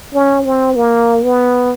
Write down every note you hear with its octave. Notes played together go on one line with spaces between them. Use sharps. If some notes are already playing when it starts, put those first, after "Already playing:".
C#4
C4
A#3
B3